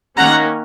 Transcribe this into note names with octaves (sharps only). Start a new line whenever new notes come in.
D#3 A#3 C#4 F#5 A#5